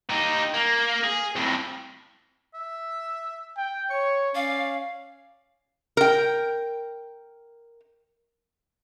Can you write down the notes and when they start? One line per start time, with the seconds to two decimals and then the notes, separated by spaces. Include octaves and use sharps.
0.10 D#4 G4
0.54 A#3
1.03 G#4
1.36 F2 A2
2.54 E5
3.57 G5
3.90 C#5 C#6
4.35 C#4 D5 F5
5.97 A#4 G5